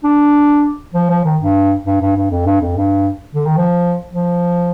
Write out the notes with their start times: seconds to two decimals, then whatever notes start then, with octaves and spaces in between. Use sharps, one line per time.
0.04 D4
0.94 F3
1.10 F3
1.24 D#3
1.41 G2
1.86 G2
2.01 G2
2.16 G2
2.31 F2
2.46 G2
2.61 F2
2.76 G2
3.35 D3
3.45 D#3
3.57 F3
4.13 F3